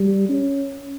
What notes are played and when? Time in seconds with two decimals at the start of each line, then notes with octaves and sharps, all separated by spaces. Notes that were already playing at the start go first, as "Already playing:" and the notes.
Already playing: G3
0.29 C#4